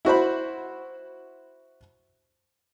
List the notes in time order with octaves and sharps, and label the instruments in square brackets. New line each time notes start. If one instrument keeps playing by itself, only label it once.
[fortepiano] E4 F#4 C5 B5